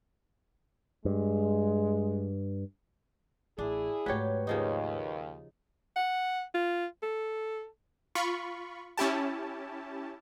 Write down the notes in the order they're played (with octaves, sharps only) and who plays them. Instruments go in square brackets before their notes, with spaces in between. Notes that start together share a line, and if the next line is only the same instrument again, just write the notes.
[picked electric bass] G2 [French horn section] G#3
[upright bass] A1 [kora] D4 [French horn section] E4 G#4
[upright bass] G#2 A3 [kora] F#3 G4 [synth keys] B4 C#5
[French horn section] D#2 [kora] C#3 F3 D#4
[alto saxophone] F#5
F4
A4
[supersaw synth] F4 B5 C#6
C#4 E4 G4 A5